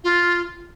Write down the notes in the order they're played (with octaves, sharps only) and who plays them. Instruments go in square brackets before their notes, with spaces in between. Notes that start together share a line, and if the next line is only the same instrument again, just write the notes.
[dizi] F4